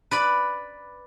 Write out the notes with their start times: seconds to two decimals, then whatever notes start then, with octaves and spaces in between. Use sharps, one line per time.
0.11 B4 D5 B5